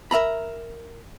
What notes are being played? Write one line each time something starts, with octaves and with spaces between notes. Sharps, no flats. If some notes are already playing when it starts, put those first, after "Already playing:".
A#4 E5 A#5 B5